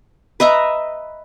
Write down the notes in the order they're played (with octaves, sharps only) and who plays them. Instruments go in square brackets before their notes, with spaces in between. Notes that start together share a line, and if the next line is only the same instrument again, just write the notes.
[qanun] B4 D#5 E5 A#5